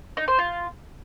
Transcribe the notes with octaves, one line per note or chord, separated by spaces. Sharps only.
D#4
C5
F4